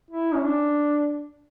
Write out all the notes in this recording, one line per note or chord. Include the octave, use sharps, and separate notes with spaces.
E4
C#4
D4